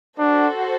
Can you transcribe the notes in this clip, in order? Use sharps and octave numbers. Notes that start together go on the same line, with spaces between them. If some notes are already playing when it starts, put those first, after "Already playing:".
D4 F#4 A4 C5